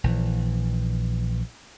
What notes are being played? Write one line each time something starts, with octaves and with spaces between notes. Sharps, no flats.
A#1 E3